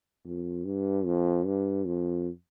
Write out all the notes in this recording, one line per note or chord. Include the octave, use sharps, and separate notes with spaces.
F2
G2
F2
G2
F2